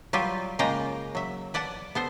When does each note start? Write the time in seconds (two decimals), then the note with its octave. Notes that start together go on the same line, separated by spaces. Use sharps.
0.13 F#3 G3 F4 G4 B4
0.59 C#3 G#3 A#3 F4 G5 A#5
1.15 F#3 E5
1.54 B4 D5 F#5 A5
1.95 B3 A4 C5